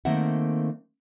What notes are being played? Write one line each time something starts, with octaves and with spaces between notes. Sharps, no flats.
D#3 A3 A#3 C4 E5 F#5